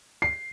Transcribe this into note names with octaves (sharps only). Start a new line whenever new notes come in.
C7